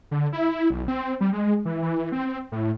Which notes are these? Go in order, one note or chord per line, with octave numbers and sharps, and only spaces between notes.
D3
E4
B1
C4
G3
G#3
E3
E3
C4
A2